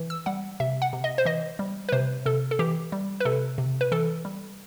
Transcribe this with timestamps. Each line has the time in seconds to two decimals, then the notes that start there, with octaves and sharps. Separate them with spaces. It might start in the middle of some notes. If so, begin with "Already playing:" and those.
Already playing: E3
0.10 E6
0.26 G3 F#5
0.60 C3 E5
0.82 F#5
0.93 C3
1.04 D#5
1.18 C5
1.26 E3 D#5
1.59 G3
1.89 B4
1.92 C3 C5
2.26 C3 A4
2.51 A4
2.59 E3 G4
2.92 G3
3.20 B4
3.25 C3 A4
3.58 C3
3.81 B4
3.92 E3 A4
4.25 G3